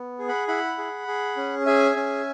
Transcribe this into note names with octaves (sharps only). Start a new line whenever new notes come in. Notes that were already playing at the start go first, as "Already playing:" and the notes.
Already playing: B3
G#4
F#5 B5
E4 F#5 B5
G#4
G#4
C#4
G#4 E5 G#5
C#4